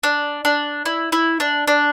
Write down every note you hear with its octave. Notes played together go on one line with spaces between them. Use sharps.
D4
D4
E4
E4
D4
D4